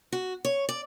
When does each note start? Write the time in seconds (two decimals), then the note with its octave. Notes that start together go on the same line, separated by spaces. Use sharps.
0.12 F#4
0.45 C#5
0.69 D5